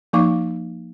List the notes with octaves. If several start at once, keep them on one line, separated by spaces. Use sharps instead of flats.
F3 A#3 D#4 F5 C#6 D6